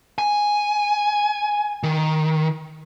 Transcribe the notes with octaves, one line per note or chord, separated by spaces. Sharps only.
G#5
D#3